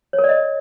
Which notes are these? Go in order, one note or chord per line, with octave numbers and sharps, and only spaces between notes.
C#5
A#4
D5
D#5